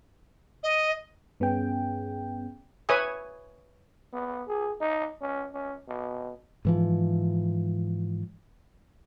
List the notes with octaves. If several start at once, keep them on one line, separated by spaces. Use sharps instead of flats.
D#5
G2 B3 C#4 G#4 G5
B4 C#5 E5 G#5 D#6
B3
G#4
D#4
C#4
C#4
B2
G#2 E3 F3